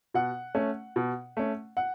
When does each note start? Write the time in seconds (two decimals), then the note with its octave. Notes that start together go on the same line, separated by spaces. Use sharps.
0.14 B2 F#5
0.55 A3 C#4
0.96 B2
1.37 A3 C#4
1.77 F#5